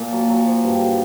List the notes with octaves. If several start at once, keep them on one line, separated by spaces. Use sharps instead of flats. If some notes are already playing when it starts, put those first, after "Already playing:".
Already playing: A#2 A5
F#3
F#3
F3
G2
D3